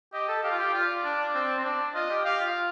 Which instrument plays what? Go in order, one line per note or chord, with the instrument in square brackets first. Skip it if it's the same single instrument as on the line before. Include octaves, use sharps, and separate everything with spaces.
[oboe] G4 [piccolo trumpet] D#5
[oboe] A4
[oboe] G4 [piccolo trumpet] F5
[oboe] F4
G4
[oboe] F4 [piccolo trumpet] D5
[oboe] D4
C4
C4
D4
[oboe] F4 [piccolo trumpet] D#5
[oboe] G4
[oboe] G4 [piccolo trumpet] F5
[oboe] F4